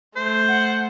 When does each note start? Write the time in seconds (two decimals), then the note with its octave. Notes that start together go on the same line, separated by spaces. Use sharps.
0.16 A3 C5
0.48 F#5